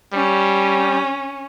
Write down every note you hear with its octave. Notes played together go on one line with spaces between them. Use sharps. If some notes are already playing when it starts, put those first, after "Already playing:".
G3 C#4